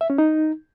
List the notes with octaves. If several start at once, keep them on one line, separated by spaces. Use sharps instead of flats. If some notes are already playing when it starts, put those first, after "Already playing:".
E5
C#4
D#4